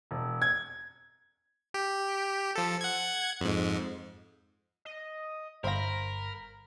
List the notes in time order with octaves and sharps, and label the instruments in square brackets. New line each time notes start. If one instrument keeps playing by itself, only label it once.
[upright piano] E1
G#6
[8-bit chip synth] G4
F3 A4
F#5 G#6
F2 G#2
[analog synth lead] D#5
[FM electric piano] G1 A#6 [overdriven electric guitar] A#4 [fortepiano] C5 F5 [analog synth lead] B5